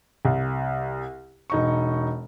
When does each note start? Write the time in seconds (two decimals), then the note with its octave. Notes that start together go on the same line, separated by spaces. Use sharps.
0.25 C2
1.50 E1 D#4 C#6